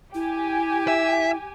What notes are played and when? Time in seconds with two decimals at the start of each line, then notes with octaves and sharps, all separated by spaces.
0.14 E4 G4 G#5
0.88 E5